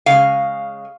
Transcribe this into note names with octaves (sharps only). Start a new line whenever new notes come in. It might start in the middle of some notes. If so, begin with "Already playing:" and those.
C#3 G#3 F5